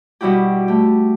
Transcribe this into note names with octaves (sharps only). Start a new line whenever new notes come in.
B2 G3 E4 F#4 G4
A3 G4